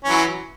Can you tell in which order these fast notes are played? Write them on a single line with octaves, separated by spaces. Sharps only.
C#4 E3 F#3